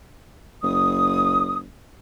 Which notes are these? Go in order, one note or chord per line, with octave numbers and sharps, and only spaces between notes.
F#1 D#6